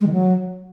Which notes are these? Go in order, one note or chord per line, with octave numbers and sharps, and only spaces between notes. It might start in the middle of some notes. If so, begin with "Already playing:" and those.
G#3
D#3
F#3